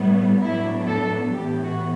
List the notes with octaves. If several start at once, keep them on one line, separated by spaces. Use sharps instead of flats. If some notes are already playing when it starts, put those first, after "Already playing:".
Already playing: A2 G3 B3
A2 F#3 B3 D4 E4
A4
A2 E3 B3 G4
F#4